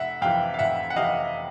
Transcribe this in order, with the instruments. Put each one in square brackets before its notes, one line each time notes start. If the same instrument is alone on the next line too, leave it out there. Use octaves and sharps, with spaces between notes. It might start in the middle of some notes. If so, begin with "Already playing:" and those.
Already playing: [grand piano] F1 E5 F#5
F2 C3 E3 F5 G5
F5
F1 E5 F#5
F#5
F2 C3 E3 D#5 F5